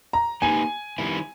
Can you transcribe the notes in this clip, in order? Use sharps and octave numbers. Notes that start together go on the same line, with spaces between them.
A#5
A#3 D#4 G4 B4 G#5
D#3 G3 B3 E4